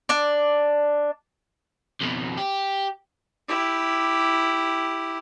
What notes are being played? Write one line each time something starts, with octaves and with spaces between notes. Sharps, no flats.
D4 D5
F2 B2
G4
E4 G4